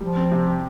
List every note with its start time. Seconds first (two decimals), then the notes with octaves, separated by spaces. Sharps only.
0.01 F3 G3
0.16 C4
0.32 C3
0.46 G4